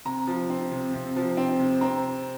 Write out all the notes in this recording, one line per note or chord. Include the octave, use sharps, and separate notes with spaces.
C3 A#5
F3
C4
C3
C3
F3
C4
C3
C4 A#5